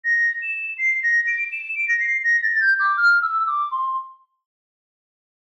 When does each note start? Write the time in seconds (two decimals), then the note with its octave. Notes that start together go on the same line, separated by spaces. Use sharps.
0.04 A#6
0.42 E7
0.78 C7
1.03 A#6
1.27 D7
1.52 E7
1.75 D7
1.88 A#6
2.00 C7
2.24 A#6
2.43 A6
2.60 G6
2.79 D6
2.97 F6
3.22 E6
3.47 D6
3.71 C6